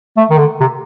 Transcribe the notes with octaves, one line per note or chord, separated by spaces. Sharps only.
A3
D#3
D3
C3